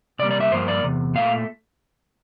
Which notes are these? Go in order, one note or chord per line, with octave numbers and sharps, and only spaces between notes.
C3 G3 A#3 D5
D5
E5
G2 F3 A#3 C5
D5
E2 C3
A#2 A3 F5